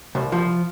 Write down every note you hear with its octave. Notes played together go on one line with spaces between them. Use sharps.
C2
F3